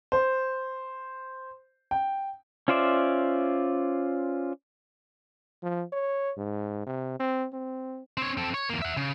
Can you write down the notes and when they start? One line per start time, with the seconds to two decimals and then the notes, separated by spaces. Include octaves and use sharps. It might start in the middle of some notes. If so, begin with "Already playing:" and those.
0.12 C5
1.91 G5
2.68 C#4 F4 C5 D5 E5
5.63 F3
5.93 C#5
6.37 G#2
6.87 C3
7.20 C4
7.53 C4
8.17 C4 C#5
8.38 C4 A4
8.54 C#5
8.69 E2 A#3
8.82 E5 F#5
8.97 C#3